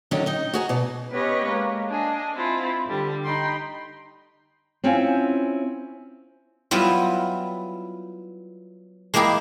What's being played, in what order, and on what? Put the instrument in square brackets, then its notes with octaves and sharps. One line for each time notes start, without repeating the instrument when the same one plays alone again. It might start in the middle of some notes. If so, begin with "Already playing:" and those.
[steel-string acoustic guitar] D3 D#3 F#3 C#4 D4
D#4 D#5
F#4 G#4 A#5
B2 D5
[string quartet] B3 C#4 G4 B4 C#5 D#5
G#3 A#3
D4 G#4 D#5
C4 E4 F4
D3 G3
D#4 G5 B5 C6
[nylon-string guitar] C4 C#4 E4 F4 F5 G#5
[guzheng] F#3 G3 B3 E4 F4
G#3 A#3 E4 G4 G#4